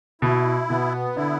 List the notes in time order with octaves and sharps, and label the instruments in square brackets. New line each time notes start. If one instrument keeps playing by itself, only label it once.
[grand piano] B2 [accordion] E4
[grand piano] B2 [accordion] B3
[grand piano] D3 [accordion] E4